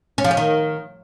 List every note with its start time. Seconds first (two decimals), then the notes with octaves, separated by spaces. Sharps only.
0.18 C#4
0.24 F3
0.31 C#4
0.37 D#3